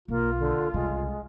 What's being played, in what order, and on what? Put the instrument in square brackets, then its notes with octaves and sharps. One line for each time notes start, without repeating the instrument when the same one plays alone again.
[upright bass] B1 [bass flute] A#3 [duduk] F4
[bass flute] D3
[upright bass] C2 C#3 [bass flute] G#3